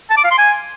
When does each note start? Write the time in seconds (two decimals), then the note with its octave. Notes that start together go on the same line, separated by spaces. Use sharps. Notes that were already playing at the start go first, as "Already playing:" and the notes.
0.10 A5
0.17 D6
0.24 F5
0.31 C6
0.38 G#5